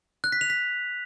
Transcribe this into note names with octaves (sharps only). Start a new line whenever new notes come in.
F#6
B6
F7
B6